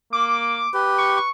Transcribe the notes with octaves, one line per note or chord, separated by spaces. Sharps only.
A#3 D6
G4 B4
C#6
C#6